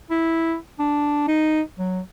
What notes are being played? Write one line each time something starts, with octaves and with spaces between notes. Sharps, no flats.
E4
D4
D#4
F#3